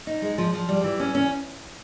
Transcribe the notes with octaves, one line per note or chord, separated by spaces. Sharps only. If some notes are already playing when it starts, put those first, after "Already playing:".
D#4
G#3
F3
F3
G3
E3
C#4
C#4